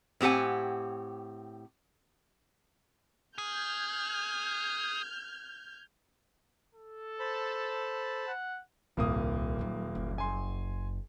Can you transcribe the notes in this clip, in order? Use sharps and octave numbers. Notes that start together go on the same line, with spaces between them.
A2 C4 G4 F#5 G#5
G#4 F6 G6 G#6
A4
C5 A5 B5
F#5
D#1 C2 G#2 A#3 D#6
D#2 F#3
F#1
G#5 C6